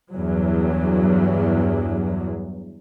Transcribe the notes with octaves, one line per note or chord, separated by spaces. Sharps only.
E2 G2 F#3